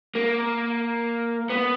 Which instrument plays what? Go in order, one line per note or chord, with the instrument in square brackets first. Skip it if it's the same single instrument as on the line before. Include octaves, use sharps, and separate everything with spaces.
[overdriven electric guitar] A#3
B3